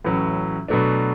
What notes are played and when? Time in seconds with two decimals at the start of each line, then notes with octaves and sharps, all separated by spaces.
0.05 A1 A2 F#3 C#4
0.68 B2 F#3 A3 D4